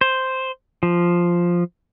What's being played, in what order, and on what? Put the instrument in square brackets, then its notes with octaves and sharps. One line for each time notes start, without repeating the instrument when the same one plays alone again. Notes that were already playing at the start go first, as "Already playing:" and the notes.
[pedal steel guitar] C5
F3